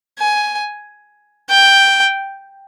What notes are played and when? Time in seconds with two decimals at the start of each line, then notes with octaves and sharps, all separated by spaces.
0.19 G#5
1.50 G5